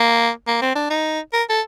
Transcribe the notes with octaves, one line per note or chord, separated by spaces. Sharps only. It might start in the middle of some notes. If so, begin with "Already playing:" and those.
Already playing: A#3
A#3
C4
D4
D#4
A#4
A4